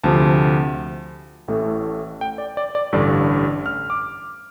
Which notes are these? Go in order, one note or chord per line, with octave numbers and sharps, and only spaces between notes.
D2 C3 F3 A5
A1 A2 A3
G5
D5
D5
D5
A1 G2 D3 D5
F6
D6